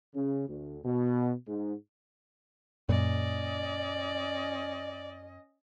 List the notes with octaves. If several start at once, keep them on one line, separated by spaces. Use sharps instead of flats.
C#3
D2
B2
G#2
F#2 A#2 C#4 D5 D#5